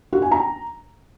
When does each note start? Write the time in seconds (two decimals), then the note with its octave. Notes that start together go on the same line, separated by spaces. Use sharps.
0.13 F#4
0.22 G#5
0.32 A#5